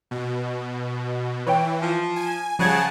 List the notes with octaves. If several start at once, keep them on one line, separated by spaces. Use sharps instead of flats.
B2
E3 B4 C#5 G5
F3
G#5
C#3 F3 G3 G#4 F#5 A5 G#6